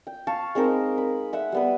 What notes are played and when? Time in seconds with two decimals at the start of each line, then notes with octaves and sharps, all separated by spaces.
0.07 G5
0.27 F5 A5 C#6
0.55 G#3 C4 D#4 A#4
0.98 B5
1.33 E5 F#5 E6
1.52 G3 B3 B4